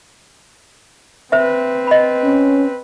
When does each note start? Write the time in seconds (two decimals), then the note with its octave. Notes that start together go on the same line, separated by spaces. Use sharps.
1.32 C4 B4 C5 E5
1.87 D#5 B5
2.24 C#4